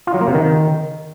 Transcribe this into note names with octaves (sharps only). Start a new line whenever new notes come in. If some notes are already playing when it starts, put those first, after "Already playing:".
F4
F#3
A#3
C3
D#3